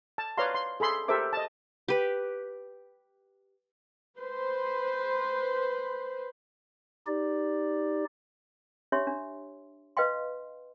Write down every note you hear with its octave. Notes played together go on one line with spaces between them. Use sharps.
A5
B4 C#5 D5 F5 A#5 C6
C6
G#4 A4 B5 C6
G4 A4 A#4 C5 E5 D6
D#5 A5
G4 B4
B4 C5
D#4 G4 D5
D4 G4 C#5 E5 C6
D4
B4 D#5 F5 G5 C6